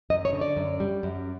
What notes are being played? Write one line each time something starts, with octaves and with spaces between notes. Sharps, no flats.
F#2 D#5
C#5
D3
D5
F#2
G3
F#2